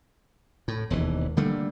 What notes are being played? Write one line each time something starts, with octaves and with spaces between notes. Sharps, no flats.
A2
E1 D#2 E3
D3 G3 A3 A#3